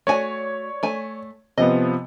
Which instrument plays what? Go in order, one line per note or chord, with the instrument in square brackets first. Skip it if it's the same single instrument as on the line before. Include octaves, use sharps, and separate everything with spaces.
[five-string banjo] A3 F#4 G#5 [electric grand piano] C#5 D5
[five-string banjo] A3 G#5
[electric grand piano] C3 F3 B3 [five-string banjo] D#5